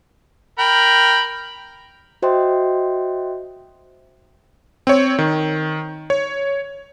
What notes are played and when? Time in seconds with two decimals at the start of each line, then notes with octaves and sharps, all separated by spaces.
0.59 A#4 G5 B5
2.22 F#4 C5 D#5 E5 G5 C6
4.87 C4 C#5
5.18 D#3
6.10 C#5